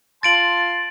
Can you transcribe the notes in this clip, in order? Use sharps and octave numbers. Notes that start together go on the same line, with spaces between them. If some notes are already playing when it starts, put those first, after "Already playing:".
F4 A5 C6 A6 D7 F#7